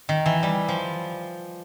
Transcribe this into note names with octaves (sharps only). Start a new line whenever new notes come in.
D#3
E3
G3
F3